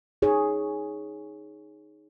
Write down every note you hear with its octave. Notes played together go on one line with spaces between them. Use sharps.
D#4 G#4 C#5